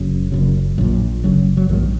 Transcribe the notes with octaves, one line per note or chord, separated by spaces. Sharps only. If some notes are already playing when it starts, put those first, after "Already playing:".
Already playing: F#1 F#2 C#3
F#1 F#2 C#3
A#1 A#2 F#3
F#1 F#2 C#3 F#3
F#3
A#1 G#2 D#3